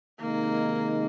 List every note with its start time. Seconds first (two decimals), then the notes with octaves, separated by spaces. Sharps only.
0.20 C3 D#3 G#3 A#3 D#4